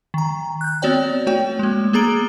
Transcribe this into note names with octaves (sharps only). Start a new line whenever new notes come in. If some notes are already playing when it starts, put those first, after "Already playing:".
D#3 A#5
F#6 G6
B3 C4 F#4 C#5 D5 G5
A3 F#4 C#5 G5
G#3 A#3
A#3 B3 G#4 A#5 D7 G7